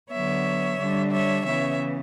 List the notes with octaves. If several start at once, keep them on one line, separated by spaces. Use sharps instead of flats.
D3 F#3 B3 C#5 E5
D3 G3 D4
C#5 E5
C#3 E3 B3 C#5 E5